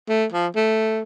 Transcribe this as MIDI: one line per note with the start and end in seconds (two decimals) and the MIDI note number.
0.09 0.26 57
0.32 0.47 53
0.56 1.03 57